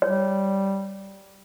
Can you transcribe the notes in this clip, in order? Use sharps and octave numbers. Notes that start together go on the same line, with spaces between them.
G3 C#5